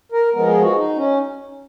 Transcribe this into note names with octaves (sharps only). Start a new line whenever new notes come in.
A#4
F3 G#3 B3 A#4
G#4
F#4
D#4
C#4